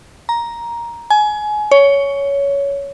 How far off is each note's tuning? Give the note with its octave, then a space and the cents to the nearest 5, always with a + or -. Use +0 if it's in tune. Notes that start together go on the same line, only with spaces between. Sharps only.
A#5 +10
G#5 +25
C#5 +15